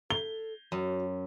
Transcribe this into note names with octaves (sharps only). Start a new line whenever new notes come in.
A4 G7
F#2 F#4